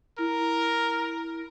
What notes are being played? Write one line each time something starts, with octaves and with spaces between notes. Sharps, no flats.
E4 A#4